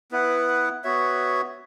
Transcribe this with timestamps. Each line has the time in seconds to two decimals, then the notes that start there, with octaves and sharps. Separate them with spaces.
0.11 B3 E4 B4 F#5
0.84 B3 F#4 C#5 E5